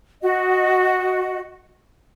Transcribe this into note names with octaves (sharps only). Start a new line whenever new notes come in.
F#4 D#5